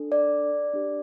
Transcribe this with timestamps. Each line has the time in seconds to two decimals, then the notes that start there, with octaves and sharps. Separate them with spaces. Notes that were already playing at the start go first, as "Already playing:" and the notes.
Already playing: D4 A4
0.12 D5
0.73 D4 G4